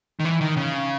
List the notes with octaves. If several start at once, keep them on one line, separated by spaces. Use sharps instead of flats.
D#3
E3
D#3
C#3